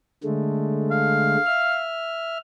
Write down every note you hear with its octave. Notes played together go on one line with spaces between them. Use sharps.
D3 G#3 A3
F5
E5 F6